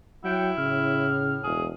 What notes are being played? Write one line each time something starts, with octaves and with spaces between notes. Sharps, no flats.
F#3 E4 F#5 G5
A2 C#3 F6
E1 G#4